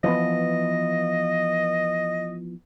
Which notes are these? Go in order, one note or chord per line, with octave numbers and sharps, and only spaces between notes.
E3 F3 B3 D#5